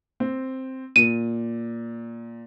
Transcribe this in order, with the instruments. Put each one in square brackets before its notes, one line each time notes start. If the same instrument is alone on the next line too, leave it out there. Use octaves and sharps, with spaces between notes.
[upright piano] C4
[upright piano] A#2 [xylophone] D#7